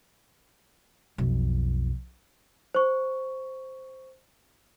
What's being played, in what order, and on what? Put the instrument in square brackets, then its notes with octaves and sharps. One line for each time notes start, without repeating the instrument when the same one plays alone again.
[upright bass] B1 F2
[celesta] C5 C#6